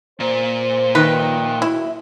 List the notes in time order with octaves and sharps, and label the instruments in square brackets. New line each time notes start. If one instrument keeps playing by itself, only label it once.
[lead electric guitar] A#2 [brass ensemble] C5
[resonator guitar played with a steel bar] D#3 [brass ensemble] F3 E5 G5 [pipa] B4
[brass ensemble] F#3 A#3 [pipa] E4